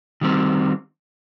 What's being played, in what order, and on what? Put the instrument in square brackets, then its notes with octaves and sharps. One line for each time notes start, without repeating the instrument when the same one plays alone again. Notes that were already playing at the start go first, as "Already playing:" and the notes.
[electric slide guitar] D#3 G3 C4